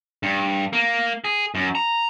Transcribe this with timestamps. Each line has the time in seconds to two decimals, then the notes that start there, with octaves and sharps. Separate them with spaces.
0.23 G2
0.73 A#3
1.24 G#4
1.55 F#2
1.75 A#5